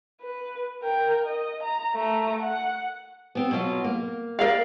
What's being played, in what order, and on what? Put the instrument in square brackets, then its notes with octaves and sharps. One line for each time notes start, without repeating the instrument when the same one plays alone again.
[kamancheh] B4
A#4 G5
D#5
A#5
A3 A#5
F#5
[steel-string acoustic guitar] B3 C4
B2 F#3 F4
A#3
[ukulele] A#4 D5 F5